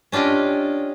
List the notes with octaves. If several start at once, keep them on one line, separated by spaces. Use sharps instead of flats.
C#4 D4 F4 G4 D#5